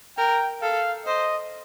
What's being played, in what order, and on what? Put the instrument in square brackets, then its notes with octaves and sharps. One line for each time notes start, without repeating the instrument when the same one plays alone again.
[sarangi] A#4 [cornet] G5
[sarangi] A4 [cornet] F5
[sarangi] C5 [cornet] D#5